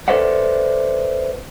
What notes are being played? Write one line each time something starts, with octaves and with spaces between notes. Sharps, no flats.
A4 B4 C5 D5 E5 F#5